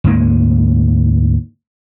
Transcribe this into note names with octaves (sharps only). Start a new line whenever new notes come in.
D2 G#2 G#3 A#3